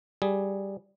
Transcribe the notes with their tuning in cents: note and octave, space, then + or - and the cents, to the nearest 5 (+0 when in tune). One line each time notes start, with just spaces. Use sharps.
G3 +0 G#4 +0